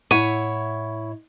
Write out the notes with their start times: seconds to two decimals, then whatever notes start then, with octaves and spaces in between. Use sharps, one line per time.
0.11 A2 E4 C#5 E5 F#5 D#7